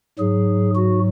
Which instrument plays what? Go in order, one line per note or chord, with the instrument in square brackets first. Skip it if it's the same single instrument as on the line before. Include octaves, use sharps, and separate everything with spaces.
[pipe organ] G#2 F#3 G#4
F#4